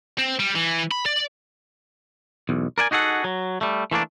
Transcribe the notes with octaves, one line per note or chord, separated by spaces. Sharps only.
C4
G3
E3
B5
D5
B1 E2
A#4 D5 G5 G#5
D#4 F#4 G#4 A4 F#5
F#3
G3 A3
E3 A3 A#3 D4